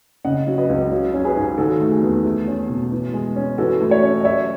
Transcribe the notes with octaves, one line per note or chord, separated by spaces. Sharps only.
C#3 D#5 F#5
F#3
B4 D#5
C#2
F#3
C#4
G#4 B4
G#2
D#3 F#4 A4
A3
G#4
E2
A3 G#4
C#4
B2
E3
G#3
C#4
E3 F#4 A4
A3
C#5 E5
C#4
D#5
F#3 C#5 E5